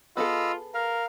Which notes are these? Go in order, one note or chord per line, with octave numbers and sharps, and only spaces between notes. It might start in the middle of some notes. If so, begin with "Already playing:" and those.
B3 F4 G#4 A4 D#5 B5 E6
A#4 F5